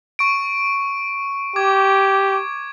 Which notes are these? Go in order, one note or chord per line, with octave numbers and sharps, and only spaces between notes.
C#6 D7
G4 D6 G#6